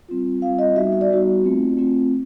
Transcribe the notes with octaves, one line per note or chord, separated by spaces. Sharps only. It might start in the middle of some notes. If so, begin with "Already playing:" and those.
G3 C4 F4
G3 C4 F4 F5
D#5
G3 B3 D#4 F#4 E5
E5
D5
G3 B3 D#4 F#4
A3 C4 F4
A3 C4 F4